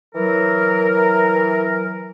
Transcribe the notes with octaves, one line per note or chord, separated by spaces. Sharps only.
E3 F#3 A#4